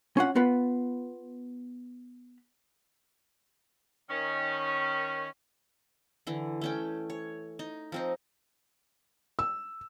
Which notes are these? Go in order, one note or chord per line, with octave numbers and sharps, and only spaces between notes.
C#4 F4 F#5
B3 F4 B4
D#3 C#4
D3 E3
A3 C#4 G5
C#5
D#4
F3 C4 D#4
E6